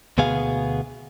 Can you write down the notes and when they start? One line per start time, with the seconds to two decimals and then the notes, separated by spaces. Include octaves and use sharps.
0.18 D2 B2 B3 G#4 F5